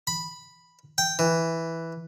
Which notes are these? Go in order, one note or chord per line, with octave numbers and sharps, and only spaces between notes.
B5
G5
E3